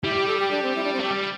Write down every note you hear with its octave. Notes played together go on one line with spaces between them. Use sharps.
G3 E4
G4
A4
G4
D4
C4
E4
D4
C4
A3 G4
G3